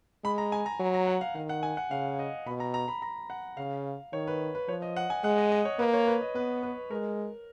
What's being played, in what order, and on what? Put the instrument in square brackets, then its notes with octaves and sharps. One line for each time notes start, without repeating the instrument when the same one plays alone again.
[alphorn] G#3 [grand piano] B5
[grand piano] A#5
G#5
A#5
[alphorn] F#3
[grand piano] A#5
F#5
F5
[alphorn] D#3 [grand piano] F5
[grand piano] F#5
G#5
F#5
[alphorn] C#3 [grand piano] F5
[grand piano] D#5
[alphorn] B2 [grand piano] B5
[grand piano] A#5
A#5
B5
A#5
F#5
[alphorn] C#3 [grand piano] F5
[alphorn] D#3 [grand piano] C#5
[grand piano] B4
B4
[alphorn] F3 [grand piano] C#5
[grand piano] D#5
F#5
G#5
[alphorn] G#3 [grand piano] F#5
[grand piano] D#5
D#5
C#5
[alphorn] A#3 [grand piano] B4
[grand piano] C#5
B4
D#5
[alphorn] B3 [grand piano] B4
[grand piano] B4
[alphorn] G#3 [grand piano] A#4